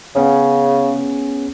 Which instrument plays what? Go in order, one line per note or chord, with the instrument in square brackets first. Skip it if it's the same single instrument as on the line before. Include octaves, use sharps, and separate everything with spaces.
[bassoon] C#3 [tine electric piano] B3 C#4 G#4